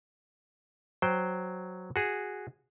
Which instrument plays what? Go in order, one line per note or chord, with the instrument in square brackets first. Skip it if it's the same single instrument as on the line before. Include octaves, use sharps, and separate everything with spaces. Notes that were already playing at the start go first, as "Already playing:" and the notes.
[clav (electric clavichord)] F#3 C5 G5
F#4 G#4